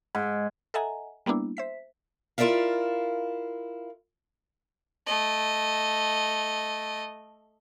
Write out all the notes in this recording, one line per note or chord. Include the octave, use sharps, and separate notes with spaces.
G#2
A4 D#5 E5 F#5 G#5 A#5
G3 A#3 B3 D4 E4
C5 E5 B6
E4 F4 A#4 D5 E5 F5
A3 D#5